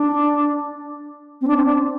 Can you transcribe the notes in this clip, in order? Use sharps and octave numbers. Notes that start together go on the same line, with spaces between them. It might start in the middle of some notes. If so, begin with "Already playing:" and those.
Already playing: D4
C4
D4
C4
D4